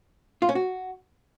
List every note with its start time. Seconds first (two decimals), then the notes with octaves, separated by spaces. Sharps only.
0.42 F4
0.49 C#4
0.55 F#4